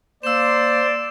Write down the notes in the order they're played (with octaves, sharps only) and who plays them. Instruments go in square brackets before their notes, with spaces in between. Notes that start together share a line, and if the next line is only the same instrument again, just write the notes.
[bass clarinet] A#3 [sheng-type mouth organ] C5 C6 [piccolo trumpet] D5 [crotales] E6 E7